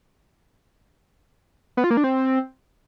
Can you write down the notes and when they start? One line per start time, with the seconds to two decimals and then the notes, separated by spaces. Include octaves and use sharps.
1.77 B3
1.84 F4
1.91 A#3
1.97 D4
2.04 C4